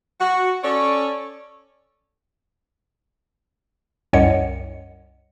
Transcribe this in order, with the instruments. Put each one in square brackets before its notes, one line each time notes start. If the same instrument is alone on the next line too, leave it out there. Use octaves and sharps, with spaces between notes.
[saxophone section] F#4
C#4 A4 C#5 D5
[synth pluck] C2 F#2 C#5 D#5 F#5 C#7